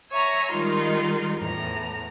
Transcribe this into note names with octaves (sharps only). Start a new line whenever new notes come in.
C#5 E5 G#5 A#5
D#3 G3 G#3 D#4 F4 C6
E2 A2 A#5